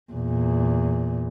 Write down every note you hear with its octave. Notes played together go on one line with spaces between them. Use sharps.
E2 A#2